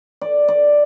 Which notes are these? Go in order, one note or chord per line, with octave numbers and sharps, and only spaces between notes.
D5
D5